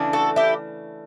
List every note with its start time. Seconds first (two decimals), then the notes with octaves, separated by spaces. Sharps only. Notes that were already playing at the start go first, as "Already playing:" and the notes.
Already playing: C#3 E3 A3 D4
0.13 F#4 A4
0.36 E4 G4